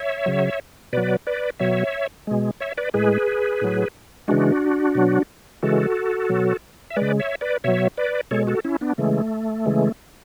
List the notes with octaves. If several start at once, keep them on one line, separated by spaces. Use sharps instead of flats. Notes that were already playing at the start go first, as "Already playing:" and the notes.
Already playing: C#5 E5
C#3 F#3
B2 F#3 B4 D5
B4 D5
B2 F#3 C#5 E5
B2 G#3
C#5 E5
B4 D5
A2 G#3 G#4 B4
A2 F#3
C#3 E3 G#3 D4 F#4
B2 F#3
C#3 E3 G#3 F#4 A4
B2 F#3
E5
C#3 G#3 B4 D5
C#5 E5
B4 D5
B2 F#3 C#5 E5
B4 D5
B2 G#3 A4 C#5
F#4 A4
C#4 E4
B3 D4
C#3 E3 G#3 A3
C#3 E3 G#3